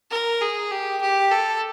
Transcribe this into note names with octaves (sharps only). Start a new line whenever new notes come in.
A#4
G#4
G4
G4
A4